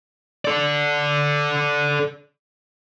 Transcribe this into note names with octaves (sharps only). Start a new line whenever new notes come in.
A4 D5